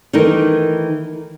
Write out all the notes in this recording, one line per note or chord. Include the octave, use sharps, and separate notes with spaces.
D#3 E3 A3 D#4 A#4